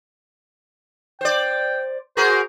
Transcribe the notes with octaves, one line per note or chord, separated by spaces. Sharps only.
C5 D5 G5
F#4 G#4 A#4 C5